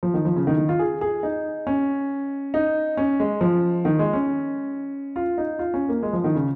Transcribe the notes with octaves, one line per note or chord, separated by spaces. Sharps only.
F3
D#3
F3
C#3
D#3
D#3
F4
G#4
G#4
D#4
C#4
D#4
C#4
G#3
F3
D#3
G#3
C#4
F4
D#4
F4
C#4
A#3
G#3
F3
D#3
C#3